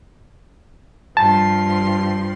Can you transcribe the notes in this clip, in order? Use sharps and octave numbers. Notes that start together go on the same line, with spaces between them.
G2 F3 A5 C6